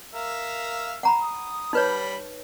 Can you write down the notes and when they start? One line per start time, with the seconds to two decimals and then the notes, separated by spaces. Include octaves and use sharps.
0.14 A#4 E5 F5
1.03 F#5 A#5 B5
1.22 D#6
1.73 G3 D#4 B4 C#5 B5